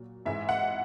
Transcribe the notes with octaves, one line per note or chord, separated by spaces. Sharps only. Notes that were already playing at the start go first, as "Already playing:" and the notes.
Already playing: A#2 F#3
G#2 E3 G#3 D#4 E5
F#5